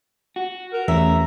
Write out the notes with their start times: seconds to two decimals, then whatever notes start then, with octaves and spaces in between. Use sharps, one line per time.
0.36 F#4
0.73 A#4
0.88 E2 A3 C#4 E5 A#5